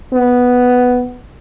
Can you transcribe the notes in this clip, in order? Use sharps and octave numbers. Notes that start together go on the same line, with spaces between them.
B3